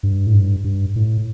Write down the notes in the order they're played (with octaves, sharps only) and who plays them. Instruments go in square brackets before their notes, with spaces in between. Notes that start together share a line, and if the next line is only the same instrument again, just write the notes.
[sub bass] G2
A2
G2
G2
A2